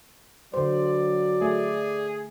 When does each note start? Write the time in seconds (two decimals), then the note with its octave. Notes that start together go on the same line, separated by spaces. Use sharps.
0.54 D3 F#3 C5 D5
1.42 A3 G#4